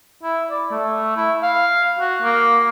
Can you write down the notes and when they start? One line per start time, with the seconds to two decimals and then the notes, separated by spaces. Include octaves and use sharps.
0.23 E4
0.50 D5
0.71 A3
1.17 E4
1.43 F5
1.99 F#4
2.22 A#3